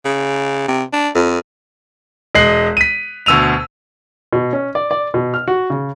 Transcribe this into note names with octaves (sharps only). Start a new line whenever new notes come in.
C#3
C3
D4
F2
E1 G#3 D#5 F#6 C7 F#7
B6 D#7
D2 B2 E6 D#7 F7
B2
C#4
D5
D5
B2
F6
F#4
C#3